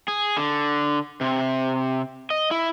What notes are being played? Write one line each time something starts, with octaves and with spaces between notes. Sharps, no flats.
G#4
D3
C3
D#5
E4